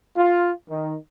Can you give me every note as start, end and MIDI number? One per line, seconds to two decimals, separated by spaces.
0.16 0.50 65
0.69 0.96 51